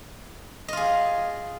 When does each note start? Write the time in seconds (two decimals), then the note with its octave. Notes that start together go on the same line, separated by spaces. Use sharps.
0.68 D#5
0.73 F4
0.77 G#4